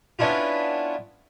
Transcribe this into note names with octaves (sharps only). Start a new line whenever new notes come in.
B3 C#4 D4 E4 F4